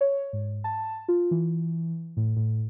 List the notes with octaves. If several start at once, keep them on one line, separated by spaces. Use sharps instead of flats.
C#5
G#2
A5
F4
E3
A2
A2